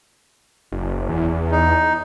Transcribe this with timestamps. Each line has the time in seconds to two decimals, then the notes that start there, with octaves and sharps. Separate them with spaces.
0.72 F#1
1.09 E2
1.51 D#4